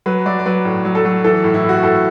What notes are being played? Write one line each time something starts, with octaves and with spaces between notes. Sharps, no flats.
F#3 B4
F#3 D5
D5
F#3 B4
A2
F#3
A4
F#3
E3 A4
A2
E4
A2 F#4
A2 A4